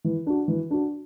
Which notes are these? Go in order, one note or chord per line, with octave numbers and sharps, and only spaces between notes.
E3
D4 F#4
E3
D4 F#4